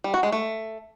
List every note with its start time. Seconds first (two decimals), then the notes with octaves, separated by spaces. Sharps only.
0.04 G3
0.14 F#4
0.23 G#3
0.32 A3